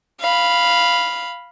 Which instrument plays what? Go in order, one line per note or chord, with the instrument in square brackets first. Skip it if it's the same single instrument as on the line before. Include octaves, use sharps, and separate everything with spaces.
[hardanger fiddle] F5 B5